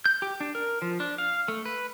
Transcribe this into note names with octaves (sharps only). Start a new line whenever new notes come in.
G6
G4
D4
A#4
F3
D4
F5
A3
B4